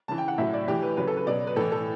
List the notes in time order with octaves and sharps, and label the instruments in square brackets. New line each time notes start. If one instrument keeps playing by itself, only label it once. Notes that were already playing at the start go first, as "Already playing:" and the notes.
[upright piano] C#3 E3 A5
G5
F#5
A2 F#3 E5
D5
A2 E3 G4
B4
C#3 F#3 B4
A4
B4
B2 F#3 D5
B4
A2 E3 A4
A4